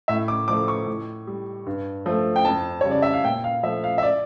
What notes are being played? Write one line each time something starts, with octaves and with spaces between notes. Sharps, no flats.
A2 E5
D6
F3 A3 D6
C#6
A2
G3
G2
F3 A3
G5
F2 A5
C#3 G3 C#5
D5
E5
F5
A#2 G5
F5
F3 A3 E5
F5
E5
D5